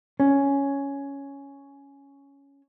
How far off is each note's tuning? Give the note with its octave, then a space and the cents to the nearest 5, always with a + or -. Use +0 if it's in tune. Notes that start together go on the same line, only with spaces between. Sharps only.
C#4 +5